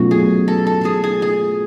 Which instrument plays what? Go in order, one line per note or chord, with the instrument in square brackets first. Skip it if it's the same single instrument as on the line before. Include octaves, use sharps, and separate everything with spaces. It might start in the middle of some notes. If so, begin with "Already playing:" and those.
Already playing: [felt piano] B2 F#3 A3 C#4 F4 [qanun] F#4
[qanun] G#4
A4
A4
G#4
G#4
G#4